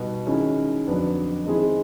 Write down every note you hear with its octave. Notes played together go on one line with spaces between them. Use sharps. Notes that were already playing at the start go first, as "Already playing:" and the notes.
Already playing: B2 G3 B3 D#4 F#4
D#3 G#3 C#4 E4
F2 D3 F#3 B3 D4
D#3 G#3 C4 E4 G#4